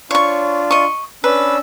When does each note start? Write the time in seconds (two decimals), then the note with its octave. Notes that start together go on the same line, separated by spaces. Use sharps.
0.11 D4 F4 C#5 C#6
0.71 D#5 C#6
1.24 C#4 D4 B4 E6